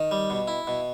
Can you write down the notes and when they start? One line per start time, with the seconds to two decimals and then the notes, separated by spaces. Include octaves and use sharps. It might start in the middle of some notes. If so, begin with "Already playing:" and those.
Already playing: D#3
0.11 G3
0.30 B2
0.48 E4
0.67 B2